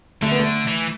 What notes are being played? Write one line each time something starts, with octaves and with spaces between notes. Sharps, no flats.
D3 A3
B3
A3
E3